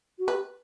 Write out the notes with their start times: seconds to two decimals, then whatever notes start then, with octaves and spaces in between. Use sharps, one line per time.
0.19 F#4
0.27 G4 B4